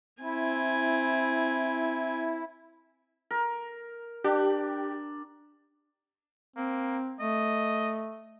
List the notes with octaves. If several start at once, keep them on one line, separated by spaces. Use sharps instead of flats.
C4 E4 G#5
A#4
D4 G4
A#3 C4
A3 D#5